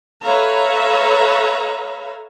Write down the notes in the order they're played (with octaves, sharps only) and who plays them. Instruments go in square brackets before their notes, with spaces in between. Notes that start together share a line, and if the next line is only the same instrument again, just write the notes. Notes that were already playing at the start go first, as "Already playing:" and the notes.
[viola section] A4 B4 C#5 E5 F5 A#5